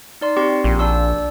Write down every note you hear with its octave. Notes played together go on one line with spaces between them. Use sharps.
D#4 D5 C6
C4 G4 C6
A#1
D4 D5 E6